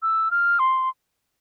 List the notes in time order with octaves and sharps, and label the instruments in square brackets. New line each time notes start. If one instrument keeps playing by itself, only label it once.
[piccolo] E6
F6
C6